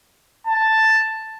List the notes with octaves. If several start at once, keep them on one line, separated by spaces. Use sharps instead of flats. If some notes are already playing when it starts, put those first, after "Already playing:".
A5